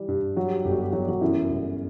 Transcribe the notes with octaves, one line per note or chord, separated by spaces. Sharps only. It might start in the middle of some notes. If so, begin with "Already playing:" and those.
Already playing: E3 G3
G2
F#3 F#4
G4
F#4
G1 G4
F#4
G4
F#3 F#4
G4
F#3 F#4
F#2 E3 E4
G1